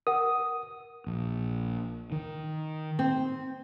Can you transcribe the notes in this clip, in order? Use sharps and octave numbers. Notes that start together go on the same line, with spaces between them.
A#4 F#5 D#6
A#1
D#3
C4